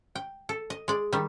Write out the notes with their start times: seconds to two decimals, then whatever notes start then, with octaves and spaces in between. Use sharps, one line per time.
0.15 G5
0.49 A4
0.70 D#5
0.88 G#3 D5
1.13 D#3 G3